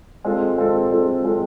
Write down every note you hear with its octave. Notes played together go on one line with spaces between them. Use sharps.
G#3 C4 F4 A4
G#3 C4 F4 A4
G#3 C4 F4 A4
G#3 C4 F4 A4